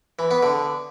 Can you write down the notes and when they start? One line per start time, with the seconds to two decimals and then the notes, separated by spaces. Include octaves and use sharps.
0.19 E3
0.31 B3
0.43 D3